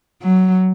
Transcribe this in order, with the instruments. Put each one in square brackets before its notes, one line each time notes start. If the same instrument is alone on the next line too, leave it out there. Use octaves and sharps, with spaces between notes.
[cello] F#3